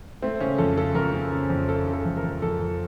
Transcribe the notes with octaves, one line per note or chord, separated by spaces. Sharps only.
A3 C4
C#3 C#4
F2 A4
C#3 A4
F2 A#4
C#3
C#3
F2
C#3 A4
C#3
A4
F2
A#4
F2
F2 A4
F2